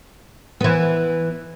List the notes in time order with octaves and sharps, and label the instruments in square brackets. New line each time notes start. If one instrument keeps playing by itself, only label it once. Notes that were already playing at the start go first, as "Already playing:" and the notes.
[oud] E3 B3